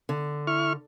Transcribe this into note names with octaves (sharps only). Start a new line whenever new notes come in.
D3
E4 C#6 F6